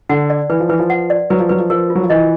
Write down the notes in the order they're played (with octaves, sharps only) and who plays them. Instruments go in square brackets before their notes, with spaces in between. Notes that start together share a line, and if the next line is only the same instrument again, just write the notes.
[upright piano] D3 [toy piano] F#5
[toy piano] D5
[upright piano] E3 [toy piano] B4
[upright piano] F3
[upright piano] E3 [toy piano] B4
[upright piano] F3
[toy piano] F#5
D5
[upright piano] F#3 [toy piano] B4
[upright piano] F3
[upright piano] F#3 [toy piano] B4
[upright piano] F3
[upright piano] F3 [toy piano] A#4
[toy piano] F4
[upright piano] F#3
F3
[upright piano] E3 [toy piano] D#5